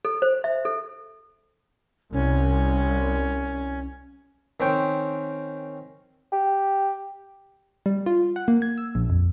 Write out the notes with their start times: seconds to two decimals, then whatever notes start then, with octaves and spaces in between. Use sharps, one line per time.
0.05 A4
0.22 C5
0.44 E5
0.65 A4
2.13 C2 C#4
4.60 D#3 C4 C#4 G5
6.32 G4
7.86 G3
8.06 F4
8.36 F#5
8.48 A#3
8.62 G#6
8.78 E6
8.95 A#1
9.10 F2